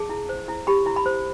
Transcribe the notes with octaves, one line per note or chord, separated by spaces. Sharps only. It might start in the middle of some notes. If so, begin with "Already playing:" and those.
Already playing: G#4 A5
E4
C5
E4
G4 B5
E4
B5
C5